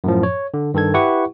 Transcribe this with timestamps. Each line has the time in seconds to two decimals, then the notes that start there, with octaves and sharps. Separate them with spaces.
0.04 F#2 A2 F3
0.23 C#5
0.54 D3
0.74 G2 D#3 A4 G#6
0.94 E4 G4 B4 F#5 C#6